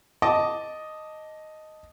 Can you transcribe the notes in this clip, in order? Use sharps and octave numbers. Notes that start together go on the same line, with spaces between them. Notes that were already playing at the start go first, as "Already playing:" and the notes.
D#5 A5 D6 D#6